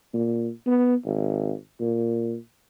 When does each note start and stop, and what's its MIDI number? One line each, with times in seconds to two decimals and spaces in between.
0.14 0.49 46
0.67 0.95 59
1.05 1.53 32
1.80 2.36 46